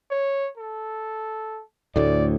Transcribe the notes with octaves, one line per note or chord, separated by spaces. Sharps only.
C#5
A4
D2 A2 D5